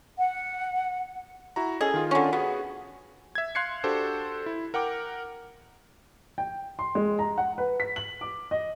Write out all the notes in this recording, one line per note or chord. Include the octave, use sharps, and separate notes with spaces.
F#5
E4 F#4 A#5
C#4 G#4 A4 D#5
D#3 F4
D3 C#4
B3 F#4 G#4
E5 G#6
F5 C6 F#6 G#6 C7 C#7
D4 F#4 G4 A4 C5
E4
A#4 F#5 G5 D6
G5
C6
G#3
A#5
F#5
B4
B6
F#7
D6
D#5